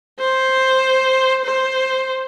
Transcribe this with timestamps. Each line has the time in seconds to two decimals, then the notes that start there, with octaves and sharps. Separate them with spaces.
0.19 C5
1.44 C5